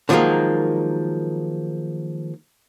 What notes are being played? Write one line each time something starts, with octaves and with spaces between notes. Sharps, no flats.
D3 D#3 F3 F#3 G#3 A#3